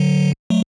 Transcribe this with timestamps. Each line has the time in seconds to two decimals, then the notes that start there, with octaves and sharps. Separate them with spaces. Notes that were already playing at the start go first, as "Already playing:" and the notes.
Already playing: D3 F#3
0.50 F#3 A3